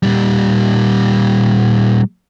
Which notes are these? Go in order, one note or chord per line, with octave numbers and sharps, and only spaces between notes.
A#2 G3